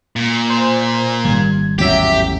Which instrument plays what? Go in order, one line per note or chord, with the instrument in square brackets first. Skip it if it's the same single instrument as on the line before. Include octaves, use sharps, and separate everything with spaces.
[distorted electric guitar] A#2
[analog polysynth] C5
[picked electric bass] G#1 D#3 G3 [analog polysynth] G#6
[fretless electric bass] A1 E2 F#3 [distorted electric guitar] G4 [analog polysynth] E5 B6